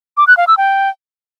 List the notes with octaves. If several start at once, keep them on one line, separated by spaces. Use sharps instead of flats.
D6
F#6
F5
E6
G5